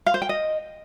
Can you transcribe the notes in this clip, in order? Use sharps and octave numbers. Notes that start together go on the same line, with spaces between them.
F5
C5
G5
D#5